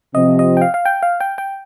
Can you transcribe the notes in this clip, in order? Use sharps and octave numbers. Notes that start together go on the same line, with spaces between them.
C3 F3 C4 D#5
D#5
G5
F5
F5
G5
F5
G5
G5